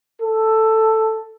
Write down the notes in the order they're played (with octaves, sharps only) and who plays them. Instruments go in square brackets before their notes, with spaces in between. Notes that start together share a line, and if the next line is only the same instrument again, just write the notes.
[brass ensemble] A4